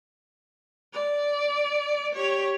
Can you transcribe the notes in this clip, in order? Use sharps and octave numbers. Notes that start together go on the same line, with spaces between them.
D5
G4 C#5